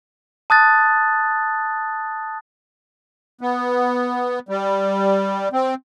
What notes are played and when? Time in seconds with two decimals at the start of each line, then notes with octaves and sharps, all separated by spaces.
0.50 A5 D#6 F#6 A6
3.41 B3
4.49 G3
5.53 C4